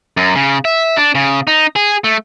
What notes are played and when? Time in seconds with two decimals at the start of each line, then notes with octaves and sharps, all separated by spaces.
0.17 F#2
0.35 C#3
0.65 E5
0.97 D4
1.15 C#3
1.47 D#4
1.76 G#4
2.04 A3